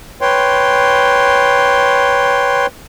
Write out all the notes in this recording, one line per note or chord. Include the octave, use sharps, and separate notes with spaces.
B4 C#5 G5 C6